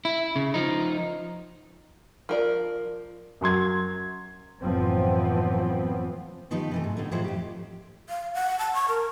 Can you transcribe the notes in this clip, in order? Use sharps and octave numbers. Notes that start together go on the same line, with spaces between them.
E4
C#3
F3 D#4
F3 A#4 D5
F#2 F#3 C6 G#6
F#1 A2 E3 F3 B3 C4
D#3 F3 B3 D#4 G4 B4
C3 E3 A3
G#2
A2 D3 B3 D#4
A2 E3 F3 G#3 A3 C5
F2 G4
F5
F#5
A5
C#6
A#4